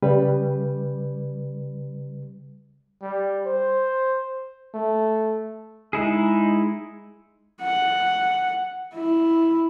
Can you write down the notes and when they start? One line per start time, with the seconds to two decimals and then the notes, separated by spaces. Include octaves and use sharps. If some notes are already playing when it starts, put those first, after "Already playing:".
0.02 C#3 G3 B4
3.02 G3
3.46 C5
4.74 A3
5.93 G#3 D#4 E4 G#4
7.61 F#5
8.94 E4